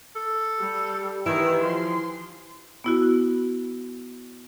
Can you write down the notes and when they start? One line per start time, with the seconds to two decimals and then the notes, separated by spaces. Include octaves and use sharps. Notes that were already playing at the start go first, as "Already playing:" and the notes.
0.16 A4
0.60 G3 G4
1.26 D#3 E3 E4
1.64 F3 C6
2.84 B3 E4 F#4